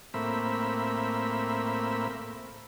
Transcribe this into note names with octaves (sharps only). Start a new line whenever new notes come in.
A2 A#3 C4 E5 B5